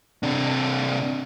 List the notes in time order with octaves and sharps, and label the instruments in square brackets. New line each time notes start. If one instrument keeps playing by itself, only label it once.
[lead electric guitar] C3 D4